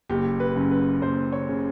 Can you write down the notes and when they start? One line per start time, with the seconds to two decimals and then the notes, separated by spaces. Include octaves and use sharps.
0.09 F#1 G4
0.40 B4
0.56 F#2 C#3
0.71 B4
1.02 F#1 C5
1.33 C#5
1.49 C#3